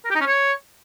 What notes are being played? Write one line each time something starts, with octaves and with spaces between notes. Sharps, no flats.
A#4
G4
D#4
C#4
C#5